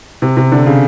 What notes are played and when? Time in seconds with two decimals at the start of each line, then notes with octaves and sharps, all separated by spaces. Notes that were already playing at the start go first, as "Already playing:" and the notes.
0.22 C3
0.37 C3
0.52 D3
0.66 C#3